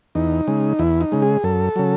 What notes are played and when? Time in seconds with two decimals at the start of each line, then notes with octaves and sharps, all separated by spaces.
0.15 E2 D#4
0.47 C#3 G#3
0.79 E2 E4
1.01 D#4
1.12 C#3 G#3
1.22 G#4
1.43 F#2 A4
1.76 C#3 F#3